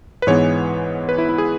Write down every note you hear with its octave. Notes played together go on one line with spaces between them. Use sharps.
B4
G#2 E3 G#3 B3 C#5
B4
E4
E4
G#4